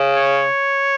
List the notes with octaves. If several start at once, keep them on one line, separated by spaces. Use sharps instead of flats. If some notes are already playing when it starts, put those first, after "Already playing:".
Already playing: C#3
C#5